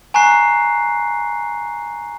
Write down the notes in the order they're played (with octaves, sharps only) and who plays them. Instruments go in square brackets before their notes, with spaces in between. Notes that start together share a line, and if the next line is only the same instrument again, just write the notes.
[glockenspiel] G#5 A#5 C#6 F#6 C7